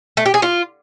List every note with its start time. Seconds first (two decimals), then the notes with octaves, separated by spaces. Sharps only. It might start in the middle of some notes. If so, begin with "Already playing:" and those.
0.17 A3
0.26 G4
0.34 G#4
0.42 F4